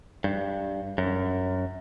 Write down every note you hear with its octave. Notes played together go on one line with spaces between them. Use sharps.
G2
F#2